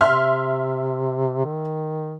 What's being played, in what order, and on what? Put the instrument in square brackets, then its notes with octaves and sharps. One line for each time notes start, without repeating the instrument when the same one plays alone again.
[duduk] C3 [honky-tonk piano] E5 C6 F6
[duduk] D#3